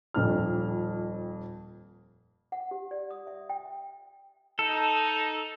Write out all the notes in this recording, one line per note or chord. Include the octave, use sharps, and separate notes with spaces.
D#1 F2 F6
F#5
G4
D5
D#6
E5
G5
D#4 A4